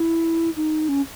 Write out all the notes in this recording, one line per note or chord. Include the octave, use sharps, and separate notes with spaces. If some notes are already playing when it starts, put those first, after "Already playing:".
Already playing: E4
D#4
C#4